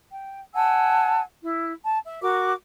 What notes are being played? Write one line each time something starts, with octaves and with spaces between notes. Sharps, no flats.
G5
F#5 G#5 A5 E6
E4
A5
E5
F#4 A#4 D6